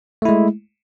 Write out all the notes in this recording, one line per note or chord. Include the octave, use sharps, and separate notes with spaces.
G#3 A3 E4